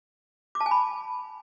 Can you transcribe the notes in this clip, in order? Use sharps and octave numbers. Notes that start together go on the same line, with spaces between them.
D6
A5
G#5
B5